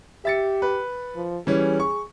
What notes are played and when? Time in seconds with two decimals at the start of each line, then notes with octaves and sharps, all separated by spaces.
0.25 G4 E5 A6 C#7
0.62 B4
1.15 F3
1.47 E3 G3 C#4 G#4
1.80 C#6